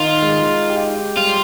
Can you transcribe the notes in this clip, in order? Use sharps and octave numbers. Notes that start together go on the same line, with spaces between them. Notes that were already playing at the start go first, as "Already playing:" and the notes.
Already playing: D#3 D#4 F4
G#3
G4
G3 F4